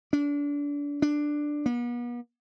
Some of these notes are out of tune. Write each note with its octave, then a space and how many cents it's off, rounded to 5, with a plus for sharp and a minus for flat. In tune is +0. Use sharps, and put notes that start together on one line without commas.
D4 -30
D4 +5
B3 -40